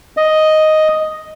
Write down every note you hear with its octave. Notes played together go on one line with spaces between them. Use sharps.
D#5